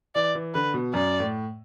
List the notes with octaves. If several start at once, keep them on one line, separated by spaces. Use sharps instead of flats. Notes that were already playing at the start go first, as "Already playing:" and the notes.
E3 D5
E3
D3 B4
B2
F#2 D5
A2